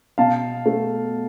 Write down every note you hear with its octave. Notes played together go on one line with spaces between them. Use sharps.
B2 F5 A5
A3